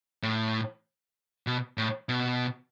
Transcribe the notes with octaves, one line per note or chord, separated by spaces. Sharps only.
A2
B2
A2
B2